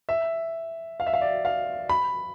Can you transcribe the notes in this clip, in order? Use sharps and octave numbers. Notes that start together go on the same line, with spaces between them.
E5
F5
E5
F5
D5
F5
B5